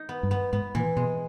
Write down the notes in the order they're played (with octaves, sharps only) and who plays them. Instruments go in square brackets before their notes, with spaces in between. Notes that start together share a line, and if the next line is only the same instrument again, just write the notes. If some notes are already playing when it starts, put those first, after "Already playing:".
Already playing: [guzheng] D#4
B3
[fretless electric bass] G2
[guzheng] B3
[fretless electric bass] G#2 [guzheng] B3
[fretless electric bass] A#2 [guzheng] E3
[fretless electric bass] B2 [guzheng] G#3